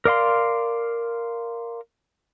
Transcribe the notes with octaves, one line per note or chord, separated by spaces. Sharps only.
A#4 D5 F5 C6